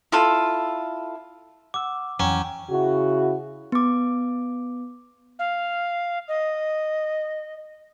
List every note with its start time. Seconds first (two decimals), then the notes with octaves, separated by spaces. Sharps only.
0.12 E4 F4 A4
1.74 F#5 D6 E6
2.20 F2 E3 F#3 C#4 F#5 G5 A#5
2.71 C#3 E4 F#4
3.72 B3 D6
5.39 F5
6.28 D#5